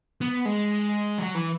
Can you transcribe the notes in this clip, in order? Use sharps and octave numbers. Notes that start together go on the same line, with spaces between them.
B3
G#3
F#3
E3